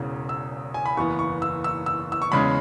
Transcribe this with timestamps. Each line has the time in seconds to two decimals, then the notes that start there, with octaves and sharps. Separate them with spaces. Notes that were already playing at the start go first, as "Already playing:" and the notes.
Already playing: E1 E2 C#3
0.29 E6
0.74 G#5
0.86 B5
0.97 F#1 E2 E3 B3 C#6
1.19 C#6
1.42 E6
1.64 E6
1.86 E6
2.12 E6
2.22 C#6
2.32 E2 C#3 G#3 C#4 B5